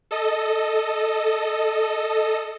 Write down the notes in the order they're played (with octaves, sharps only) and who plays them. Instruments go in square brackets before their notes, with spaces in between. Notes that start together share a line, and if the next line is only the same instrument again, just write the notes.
[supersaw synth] A4 D#5